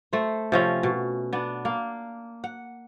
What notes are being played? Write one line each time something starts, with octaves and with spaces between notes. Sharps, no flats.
A3 C5
C3 F3 C#4
B2
B3 D4
A#3
F#5